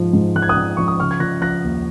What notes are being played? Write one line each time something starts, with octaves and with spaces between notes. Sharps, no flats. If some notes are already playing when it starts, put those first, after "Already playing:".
Already playing: G#2 F3
G#2
F3 F#6
G#6
D#6 F#6
F3
F3 C#6
D#6
C#3 C#6 F6
G#6
F3 F#6 A#6
F3 F#6 A#6
D#2